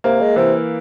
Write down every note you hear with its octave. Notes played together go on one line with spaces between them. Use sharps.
C3 A#3
G#3
C3 E3